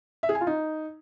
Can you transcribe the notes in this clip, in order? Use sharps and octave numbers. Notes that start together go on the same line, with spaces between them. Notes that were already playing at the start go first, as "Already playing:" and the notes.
E5
G#4
G#5
F4
D#4